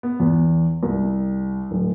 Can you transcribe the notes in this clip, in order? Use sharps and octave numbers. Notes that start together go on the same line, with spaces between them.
B3
E2
C2
D1